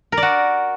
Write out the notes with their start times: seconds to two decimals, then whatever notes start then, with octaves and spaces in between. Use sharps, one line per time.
0.12 A#4
0.17 D5
0.22 F#4